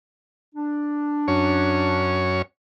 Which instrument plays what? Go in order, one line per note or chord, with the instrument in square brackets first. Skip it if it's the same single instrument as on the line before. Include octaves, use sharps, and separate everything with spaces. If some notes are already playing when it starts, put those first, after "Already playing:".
[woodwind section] D4
[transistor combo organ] F#2 C#4 C#5